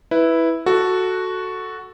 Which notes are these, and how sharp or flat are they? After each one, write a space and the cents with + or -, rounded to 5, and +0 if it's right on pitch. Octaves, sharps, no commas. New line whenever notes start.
E4 -5 B4 +0
F#4 +0 A4 +0